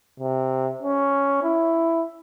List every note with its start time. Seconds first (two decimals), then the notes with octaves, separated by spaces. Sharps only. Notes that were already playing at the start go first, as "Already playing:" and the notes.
0.20 C3
0.83 C#4
1.43 E4